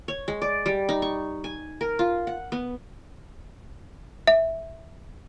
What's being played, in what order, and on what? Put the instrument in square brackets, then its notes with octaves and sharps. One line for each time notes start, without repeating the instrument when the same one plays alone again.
[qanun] C#5
G#3
D5
G3
D#4
C#6
G#5
A#4
F4
F#5
B3
[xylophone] E5